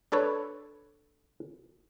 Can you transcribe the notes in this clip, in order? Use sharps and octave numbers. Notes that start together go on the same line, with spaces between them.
D4 A4 B4 C#5